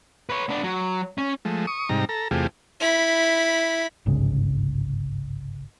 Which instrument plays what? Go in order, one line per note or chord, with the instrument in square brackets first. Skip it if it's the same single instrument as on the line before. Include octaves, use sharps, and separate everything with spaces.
[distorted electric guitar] B4 C#5
B3 D4
F#3
C#4
[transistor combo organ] F3 G#3 A3
C#6 D#6
G#2 C3 G3 D#4 A#5
A4 A#5
E2 C3 A3 F4 G4 G#4
[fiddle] E4 B5
[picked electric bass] G1 C2 G#2 C#3